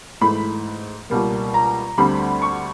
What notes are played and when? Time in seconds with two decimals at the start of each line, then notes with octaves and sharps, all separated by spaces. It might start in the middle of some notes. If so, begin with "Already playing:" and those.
0.21 G#2 E3 A3 B5
1.10 C#2 B2 G3 A#3
1.54 A#5
1.98 D2 D3 G3 C4 B5
2.42 C#6